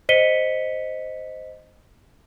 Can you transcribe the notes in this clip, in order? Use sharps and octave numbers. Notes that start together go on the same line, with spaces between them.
C5 D#5 B6 C#7 D#7 G7